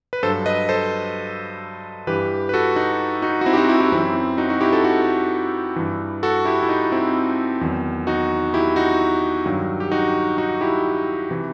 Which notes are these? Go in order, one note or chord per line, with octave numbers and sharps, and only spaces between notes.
B4
G2 F#3 A4 C5
B4 D#5
A4 C5
G2 E3 G4 B4
B4
F#4 A4
D#4 F#4
D#4 F#4
F#4
C4 E4
G4
D#4 F#4
E4 G4
E4 G4
F#2 E3 C4 E4
D#4 F#4
D#4 F#4
E4 G4
F#4 A4
F#4 A4
G2 E3
F#4 A4
E4 G4
E4
D#4
C4 E4
E2 D#3 F#3
D#4 F#4
E4 G4
D#4 F#4
G2 D#3 F#3
G4
D#4 F#4
D#4 F#4
E4 G4
C3 E3